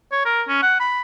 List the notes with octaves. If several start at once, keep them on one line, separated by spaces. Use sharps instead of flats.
C#5
A#4
C#4
F#5
B5